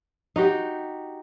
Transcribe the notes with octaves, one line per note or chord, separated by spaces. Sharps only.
D#4 F#4 G4